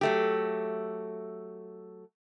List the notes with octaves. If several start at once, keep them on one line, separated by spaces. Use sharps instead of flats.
F#3 A3 G4